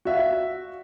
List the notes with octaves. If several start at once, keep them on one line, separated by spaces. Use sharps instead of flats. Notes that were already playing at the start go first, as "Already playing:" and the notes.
F#4 E5 F5